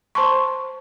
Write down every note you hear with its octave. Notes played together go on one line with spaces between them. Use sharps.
C5 A5 C6 C#6